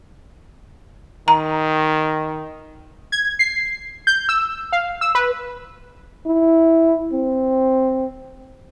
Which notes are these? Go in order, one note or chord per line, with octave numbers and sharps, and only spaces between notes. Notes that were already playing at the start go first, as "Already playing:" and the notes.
D#3 A#5
G#6
C7
G6
E6
F5
E6
B4
E4
C4